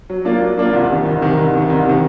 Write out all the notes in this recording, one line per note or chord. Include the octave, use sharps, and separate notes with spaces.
F#3
A#3 D4 F4
F#3
A#3 D4 F4
C2
C3 D#3
C2
C3 D#3
C2
C3 D#3
C2
C3 D#3